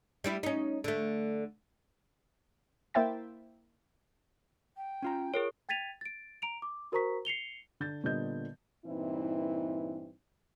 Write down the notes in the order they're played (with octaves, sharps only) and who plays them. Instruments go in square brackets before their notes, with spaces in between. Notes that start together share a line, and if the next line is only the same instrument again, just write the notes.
[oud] G3 D4 E4
C#4 D#4
D3 A3
[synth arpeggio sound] A#3 E4 C5 E5 G5 A6
[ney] G5
[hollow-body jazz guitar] C#4 F4 A#5
[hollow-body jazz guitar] F4 [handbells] G#4 A#4 C#5
[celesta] G5 G#6 A6 B6 D#7 F7
A6 D7
A#5 D7 F7
D6
F#4 A#4 C5 A#5 C#6 B6
C7 C#7 F7 G7
[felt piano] D3 G6 A6
A#2 D3 G3 B3 D#5 G6
[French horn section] G2 A#2 E3 C4 D#4 E4